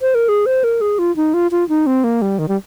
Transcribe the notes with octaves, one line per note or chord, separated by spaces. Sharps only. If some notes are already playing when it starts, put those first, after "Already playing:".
C5
A#4
G#4
C5
A#4
G#4
F4
D#4
F4
F4
D#4
C4
A#3
G3
D#3
G3